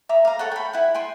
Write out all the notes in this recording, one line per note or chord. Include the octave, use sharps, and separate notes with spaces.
E5 A#5 D6
F5 A#5
A4 C#5 F#5
G5 B5
E4 F#5
G5 G#5 C6